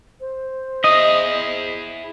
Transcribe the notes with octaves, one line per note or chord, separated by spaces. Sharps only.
C5
E4 G#4 D#5